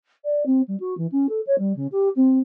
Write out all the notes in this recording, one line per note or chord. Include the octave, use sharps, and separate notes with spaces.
D5
C4
G3
F#4
E3
C#4
A4
C#5
G3
C#3
G4
C4